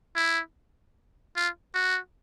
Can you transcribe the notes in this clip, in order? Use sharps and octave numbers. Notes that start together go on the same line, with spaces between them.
E4
F4
F#4